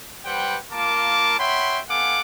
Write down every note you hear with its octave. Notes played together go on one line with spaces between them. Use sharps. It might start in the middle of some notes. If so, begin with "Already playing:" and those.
G3 B4 C5 F#5 G5
A#3 F4 A#4 A5 D6
C#5 E5 F#5 G5 B5 C6
B3 A4 F5 F#5 G#5 D6